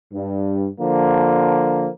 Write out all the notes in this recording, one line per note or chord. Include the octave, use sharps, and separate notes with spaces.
G2
D3 F3 A#3